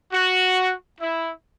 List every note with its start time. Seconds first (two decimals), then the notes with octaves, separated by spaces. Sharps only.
0.12 F#4
1.00 E4